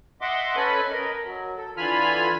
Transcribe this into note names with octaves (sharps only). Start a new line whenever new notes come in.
D#5 E5 F#5 C6 D6
C#4 A4 B4 G#5 B5
A#4 D#5
F#3
A4
D3 E3 F4 G#5 B5 F6